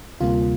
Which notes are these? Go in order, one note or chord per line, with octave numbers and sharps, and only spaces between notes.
D2 C3 G3 A#3 F4